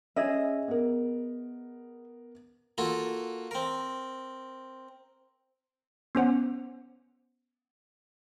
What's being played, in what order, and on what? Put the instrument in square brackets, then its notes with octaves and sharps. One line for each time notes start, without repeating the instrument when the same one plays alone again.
[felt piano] C#4 [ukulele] G#4 D#5 E5
[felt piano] B3 A#4
[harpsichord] A#3 F4 F#4 A4
C4 A#4
[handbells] B3 C#4 C5 F#5